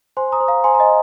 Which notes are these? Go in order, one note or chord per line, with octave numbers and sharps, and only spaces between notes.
C5 G#5 C6
A#5 D#6
C5
F5 A#5
C5 G#5 C6
A#5
D#5 G#5